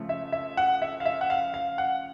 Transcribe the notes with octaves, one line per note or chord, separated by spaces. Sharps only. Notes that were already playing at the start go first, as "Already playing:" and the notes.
Already playing: C#3 F3 A3
E5
E5
F#5
E5
F5
E5
F#5
F5
F5
F#5